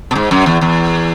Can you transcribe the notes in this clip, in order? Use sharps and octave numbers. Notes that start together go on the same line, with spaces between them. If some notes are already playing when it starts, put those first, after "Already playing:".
B2
G#2
F#2
E2
E2